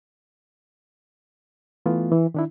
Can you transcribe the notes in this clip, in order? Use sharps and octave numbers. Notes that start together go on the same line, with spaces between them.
E3 A3 B3 F4
E3
D#3 D4 E4